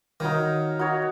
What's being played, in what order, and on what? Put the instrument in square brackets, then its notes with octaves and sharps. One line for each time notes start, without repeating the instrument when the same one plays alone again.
[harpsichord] D#3 [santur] D#4 F#4 C#5 F5
[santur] D#4 F#4 C#5 F5